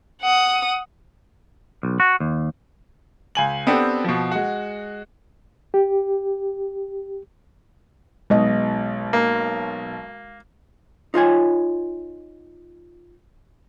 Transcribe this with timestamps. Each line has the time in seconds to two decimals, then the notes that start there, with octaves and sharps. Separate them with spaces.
0.22 F#5 D#6
1.83 B1
2.00 F#4
2.20 D#2
3.35 C#2 G#5 F#7
3.67 B3 C4 D4 G4 A4
4.04 B2 F3
4.31 G#3 F#4
5.74 G4
8.30 B1 B2 G#3 D#5
9.13 A#3
11.14 D#4 F4 C#5 G#5